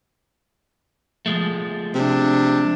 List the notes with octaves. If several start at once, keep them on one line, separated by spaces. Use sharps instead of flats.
F3 G#3 A3
C3 D4